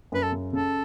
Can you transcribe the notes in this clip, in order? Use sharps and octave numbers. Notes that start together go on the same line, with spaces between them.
F#2 B4
A4
C#3
C#3 A4